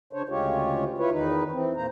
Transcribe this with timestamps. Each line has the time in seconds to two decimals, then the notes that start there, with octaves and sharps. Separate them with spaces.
0.13 C#3 D4 C5 C#5
0.29 D2 C#3 G#3 F4 G4 C#5
0.98 E4 F4 B4 C#5
1.11 E2 D#3 D#4 B4
1.52 E3 C4
1.77 A#2 A#3 C5 A#5